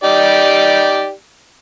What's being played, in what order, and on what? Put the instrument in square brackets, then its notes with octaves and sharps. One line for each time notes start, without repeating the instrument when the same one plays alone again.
[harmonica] D#4 G4 D5